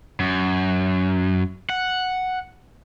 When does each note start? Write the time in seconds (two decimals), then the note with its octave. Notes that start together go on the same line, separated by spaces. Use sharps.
0.20 F#2
1.70 F#5